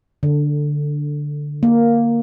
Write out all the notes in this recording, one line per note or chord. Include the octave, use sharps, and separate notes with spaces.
D3
A#3